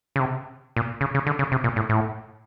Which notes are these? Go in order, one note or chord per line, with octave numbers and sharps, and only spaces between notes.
C#3
C3
A#2
C#3
C#3
D3
C#3
C3
A#2
A2
A2